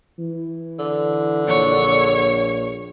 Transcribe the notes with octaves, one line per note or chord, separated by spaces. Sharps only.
E3
D3
A#1 C#5